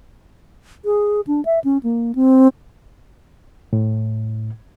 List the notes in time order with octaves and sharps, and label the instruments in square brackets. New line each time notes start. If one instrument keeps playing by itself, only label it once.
[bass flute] G#4
D4
E5
C#4
A#3
C4
[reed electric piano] A2